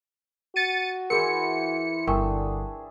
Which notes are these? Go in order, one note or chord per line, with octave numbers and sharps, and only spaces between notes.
F#4 A6 C#7 D#7
E3 E4 G#4 A#4 C5 C#7
G1 D3 D4 G#4 A#4 E5 G5 C#6